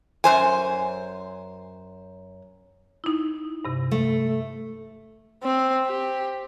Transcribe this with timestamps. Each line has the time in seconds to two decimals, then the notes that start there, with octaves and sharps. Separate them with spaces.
0.24 F#2 C5 G#5
3.04 D#4 E4
3.65 G2 C3
3.91 A3
5.43 C4
5.87 G4